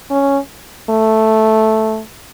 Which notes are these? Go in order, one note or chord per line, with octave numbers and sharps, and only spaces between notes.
C#4
A3